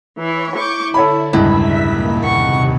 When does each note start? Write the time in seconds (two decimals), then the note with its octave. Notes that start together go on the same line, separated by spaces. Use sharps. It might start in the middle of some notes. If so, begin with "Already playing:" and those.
0.17 E3 E4 C#5
0.57 E4 C#6 D6 G6
0.94 D3 A4 C#5 B5
1.33 E1 C#2 G2 E4 E5 B6
1.85 A#2 A#3
2.21 D#2 C3 F#5 C#6